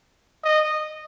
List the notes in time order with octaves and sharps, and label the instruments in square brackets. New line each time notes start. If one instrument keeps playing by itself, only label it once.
[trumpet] D#5